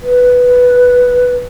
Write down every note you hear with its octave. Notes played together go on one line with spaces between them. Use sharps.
B4